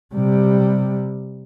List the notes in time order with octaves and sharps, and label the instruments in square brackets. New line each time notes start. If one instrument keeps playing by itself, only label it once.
[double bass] C3 G3